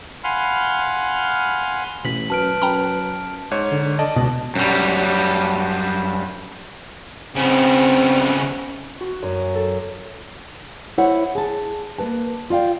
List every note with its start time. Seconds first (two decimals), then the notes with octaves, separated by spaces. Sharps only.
0.24 F5 F#5 G#5 B5 C6 F6
2.05 A1 B2 B6 F#7
2.30 F#2 B4 A5 F6 D7
2.62 F#2 G5 A#5 B5
3.51 G#2 C#5
3.71 D3
3.99 D5 D#5 A5
4.16 C#2 B2
4.55 F#2 G3
7.35 C#3 B3 C4
9.00 F#4
9.22 F#2
9.55 A4
10.98 E4 C5 C#5 F#5
11.35 G#4 A5
11.98 A#3 B4 A5
12.50 F4 D5 F5 G5